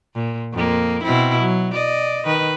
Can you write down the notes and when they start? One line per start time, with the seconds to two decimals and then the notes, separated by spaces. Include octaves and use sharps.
0.15 A#2
0.53 F2 A#3
1.03 B2 C4 E4
1.40 F#3
1.73 D5 D#5
2.25 D#3 B4